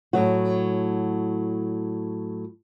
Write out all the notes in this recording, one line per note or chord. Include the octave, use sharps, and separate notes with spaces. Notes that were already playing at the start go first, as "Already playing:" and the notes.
A2 F#3 F#4